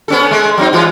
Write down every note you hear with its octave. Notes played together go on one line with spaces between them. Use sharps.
B3 C#4 A4
G#3 A3
F#3 C4 D#4
E3 G#3 F4